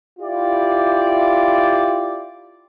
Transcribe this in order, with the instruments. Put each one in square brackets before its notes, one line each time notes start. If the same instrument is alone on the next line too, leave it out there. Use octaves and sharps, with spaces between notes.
[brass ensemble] E4 F4 G4 D5